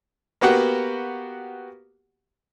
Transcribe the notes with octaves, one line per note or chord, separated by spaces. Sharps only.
A#3 B3 F#4 G4 F#5